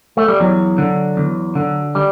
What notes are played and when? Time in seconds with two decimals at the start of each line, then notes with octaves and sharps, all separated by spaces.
0.17 A3
0.28 G3
0.40 E2 F#3
0.78 D3
1.17 E2
1.55 D3
1.95 G3